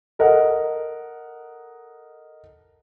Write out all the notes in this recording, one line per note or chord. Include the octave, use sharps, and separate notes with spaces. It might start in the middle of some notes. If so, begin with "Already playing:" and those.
A4 A#4 D#5 F#5